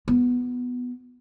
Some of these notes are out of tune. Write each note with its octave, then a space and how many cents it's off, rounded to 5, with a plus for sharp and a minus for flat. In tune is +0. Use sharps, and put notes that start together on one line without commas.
B3 +0 F4 +10